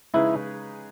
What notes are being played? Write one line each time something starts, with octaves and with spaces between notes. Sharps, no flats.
C#3 G#3 D#4 E4 G#4 B4